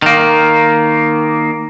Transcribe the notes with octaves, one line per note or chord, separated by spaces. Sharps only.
D#3 A#3